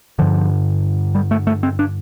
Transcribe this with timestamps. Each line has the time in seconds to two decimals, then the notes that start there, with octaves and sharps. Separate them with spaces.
0.19 G2 D3 F3
1.15 G3
1.31 A3
1.47 A3
1.63 C4
1.79 D4